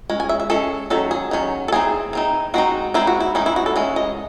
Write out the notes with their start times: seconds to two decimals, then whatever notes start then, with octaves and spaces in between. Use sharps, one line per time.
0.10 G#3 C#4
0.20 G#5
0.29 E5
0.40 E5
0.50 G#3 C#4 A4
0.90 D#3 F#3 C#4 A4
1.11 G#4
1.31 D#3 F#3 C#4
1.68 A4
1.72 E3 C4 D#4 G#4
2.13 E3 C4 D#4
2.54 G#3 C4 D#4 F#4
2.94 G#3 C4 D#4 E4
3.07 F#4
3.20 E4
3.35 E3 G#3 C#4 D#4
3.46 E4
3.56 F#4
3.66 A4
3.76 E3 G#3 C#4
3.96 D#5